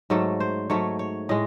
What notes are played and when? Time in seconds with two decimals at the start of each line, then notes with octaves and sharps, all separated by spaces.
0.10 G#2 F#3 A3 A4
0.40 C5
0.70 G#2 F#3 A3 C#5
0.99 C#5
1.29 A2 G#3 D#5